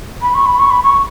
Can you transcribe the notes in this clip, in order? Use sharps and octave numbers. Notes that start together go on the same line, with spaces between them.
B5
C#6
B5
C#6
B5
C#6